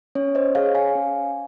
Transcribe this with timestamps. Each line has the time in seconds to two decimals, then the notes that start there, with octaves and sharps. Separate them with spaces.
0.15 C#4 C#5
0.35 C5 D#5
0.55 G#4 C#5 F5
0.75 F5 G#5
0.95 C#4